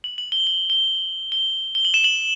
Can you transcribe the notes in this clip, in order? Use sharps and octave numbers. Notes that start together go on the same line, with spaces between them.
F#7
F#7
G7
G7
G7
G7
G7
F#7
E7
F#7